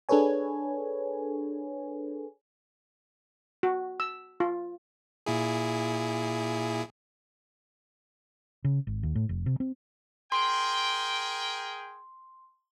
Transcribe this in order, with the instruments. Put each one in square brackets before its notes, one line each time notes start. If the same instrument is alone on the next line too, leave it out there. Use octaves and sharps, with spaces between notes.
[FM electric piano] D4 G#4 A4 B4 C#5 G#5
[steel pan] F#4
E6
F4
[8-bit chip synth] A#2 E4 G#4
[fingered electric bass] C#3
G#1
D#2
A2
F1
C3
C4
[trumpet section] G#4 A#4 G5 [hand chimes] C6